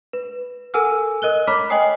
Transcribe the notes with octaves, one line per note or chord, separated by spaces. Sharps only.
B4
A4 A#4 F#5 G#5 E6 F6
A#4 D#5 F#6 G7
C#5 A#5 B5 D6 F6 B6
C#5 D#5 G5 G#5 D#6 C7